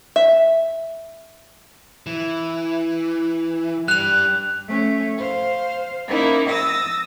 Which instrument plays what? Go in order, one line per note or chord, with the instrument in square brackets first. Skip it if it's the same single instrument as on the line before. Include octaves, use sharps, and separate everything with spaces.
[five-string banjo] E5
[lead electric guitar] E3
[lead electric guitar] G3 D4 [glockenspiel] F#6 F7
[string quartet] A3 C#4
C5 F5
A#3 C#4 D#4 E4
D#6 E6 A6 A#6